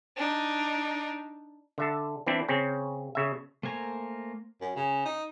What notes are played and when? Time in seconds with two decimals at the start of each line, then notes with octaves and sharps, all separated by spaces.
0.16 D4 D#4
1.78 D3 E5 A5
2.26 E3 C4 D4 E4
2.49 C#3 C4 C#4
3.15 C#3 E5
3.63 A3 A#3 C5 G#5 A#5
4.61 F#2
4.76 C#3
5.05 D#4